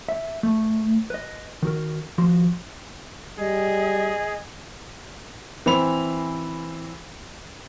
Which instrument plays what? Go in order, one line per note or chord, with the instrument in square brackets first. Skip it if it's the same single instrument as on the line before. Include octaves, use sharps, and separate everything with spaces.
[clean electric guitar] E5
A3
B4 D#5
D#3 F#4 A#4
D#2 F3 F#4 C6
[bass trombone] G3 [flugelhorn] G#4 [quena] D#5
[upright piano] E3 C4 B5 F7